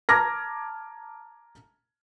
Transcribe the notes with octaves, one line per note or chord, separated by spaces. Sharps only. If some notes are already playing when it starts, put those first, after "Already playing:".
A5 A#5 D6 F6 G#6 A#6